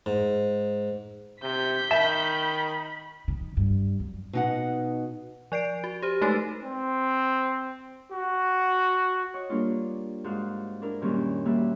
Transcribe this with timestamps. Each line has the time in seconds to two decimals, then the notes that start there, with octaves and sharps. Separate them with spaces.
0.06 G#2
1.43 C3 G6 B6
1.91 D#3 E5 A5 B5
3.28 D#3
3.57 G2
4.00 F#2
4.33 B2 D#4 F#5
5.52 F3 D5 C7 D7
5.84 F#4
6.02 G4 C5
6.21 G#3 A3 D#4 A4 B4 A6
6.63 C4
8.11 F#4
9.34 C#5 D#5 C#6 D6
9.50 G3 A#3 D4 F4
10.24 G#2 F#4 F5 F#6
10.82 D4 E4 A#4
11.02 F#2 A#2 D#3 G3 C#4 E4
11.45 G3 A#3 F#4 E5 F#6